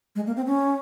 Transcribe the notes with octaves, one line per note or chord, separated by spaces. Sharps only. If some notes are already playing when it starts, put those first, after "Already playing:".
G#3
A#3
C4
C#4